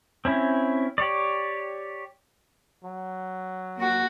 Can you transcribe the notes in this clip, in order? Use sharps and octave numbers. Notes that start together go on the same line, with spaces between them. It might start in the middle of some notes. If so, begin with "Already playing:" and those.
C4 C#4 E4
G4 C#5 D5
F#3
A#3 F#4